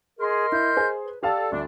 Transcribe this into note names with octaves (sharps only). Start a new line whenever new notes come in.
G#4 A#4 D#5 C6
E4 G6
G#4 C5
B4
G4 A4 D5 F5 A5
D2 G3 A3 D4